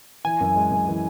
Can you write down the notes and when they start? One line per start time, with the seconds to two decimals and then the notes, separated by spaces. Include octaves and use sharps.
0.24 E3 G#5
0.40 F#2
0.56 G#3
0.71 F#2
0.87 E3